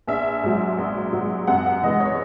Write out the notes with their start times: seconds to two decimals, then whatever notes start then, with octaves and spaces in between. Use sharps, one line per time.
0.07 A#1 E5
0.43 G#2 F#3
0.78 A#1
1.12 G#2 F#3
1.47 F#2 F#5
1.66 F#5
1.83 E3 G#3 D#5
2.00 C#5